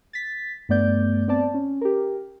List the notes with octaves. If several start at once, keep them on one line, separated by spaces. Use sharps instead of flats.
A6 B6
G2 A3 B3 D5 G6
B3 C4 D5 A5
C#4
G4 A#4